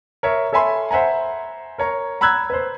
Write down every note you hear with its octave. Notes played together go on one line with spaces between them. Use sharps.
A#4 C#5 E5
A4 C#5 E5 G#5 B5 C6
C5 E5 F#5 G#5 A#5
A#4 C#5 A#5
A#5 B5 E6 F#6 G#6
B4 C5